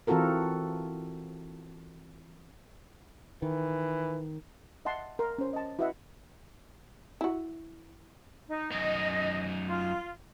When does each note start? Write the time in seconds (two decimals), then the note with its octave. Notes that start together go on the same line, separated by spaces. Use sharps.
0.07 E3 C4 F4 F#4 A4 A#4
3.42 D#3 E3
4.85 D#5 E5 F#5 A5 C6
5.19 A#4 C6
5.38 C#4 C5
5.53 D#5 A5
5.79 E4 F#4 B4 D#5 E5 F#5
7.21 E4 F#4
8.49 D#4
8.72 F#2 D#4 D#5
9.68 F4